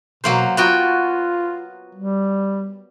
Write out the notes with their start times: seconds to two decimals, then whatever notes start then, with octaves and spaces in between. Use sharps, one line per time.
0.24 B2 F#3 A#3 C5
0.57 B3 F4 F#4 G5
1.95 G3